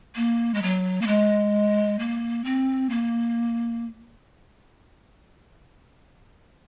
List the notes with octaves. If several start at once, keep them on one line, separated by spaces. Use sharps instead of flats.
A#3
G#3
F#3
A#3
G#3
A#3
C4
A#3